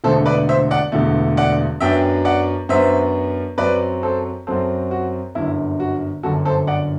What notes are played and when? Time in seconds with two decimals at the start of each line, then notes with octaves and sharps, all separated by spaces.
0.04 E1 E2 D3 A3 A4 C5
0.26 B4 D5
0.49 C5 E5
0.71 D5 F#5
0.92 E1 E2 D3 A3
1.37 D5 F#5
1.80 F#2 F#3 B3 D4 E5 G5
2.25 D5 F#5
2.69 F#2 F#3 B3 D4 C5 E5
3.58 F#2 F#3 C4 B4 D5
4.03 A4 C5
4.47 F#2 F#3 C4 A4 C5
4.91 F#4
5.35 G1 F#2 D3 E4
5.80 F#4
6.23 G1 F#2 D3 F#4 A4
6.45 A4 C5
6.67 D5 F#5